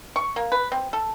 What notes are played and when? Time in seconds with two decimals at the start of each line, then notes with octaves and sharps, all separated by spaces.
0.16 C#6
0.36 A#3
0.52 B4
0.72 C4
0.93 A4